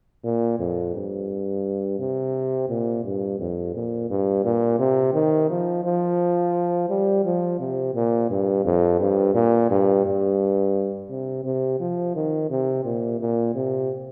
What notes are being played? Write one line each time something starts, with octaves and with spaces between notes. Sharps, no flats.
A#2
F2
G2
C3
A#2
G2
F2
A#2
G2
A#2
C3
D#3
F3
F3
G3
F3
C3
A#2
G2
F2
G2
A#2
G2
G2
C3
C3
F3
D#3
C3
A#2
A#2
C3